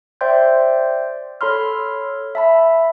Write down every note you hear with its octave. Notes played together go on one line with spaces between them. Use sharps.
C5 D5 E5 G5 C6 G6
A4 C#5 B5 C6 F6
E5 A5 B5